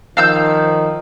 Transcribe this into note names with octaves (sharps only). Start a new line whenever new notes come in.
D#3 F3 F5 E6 G6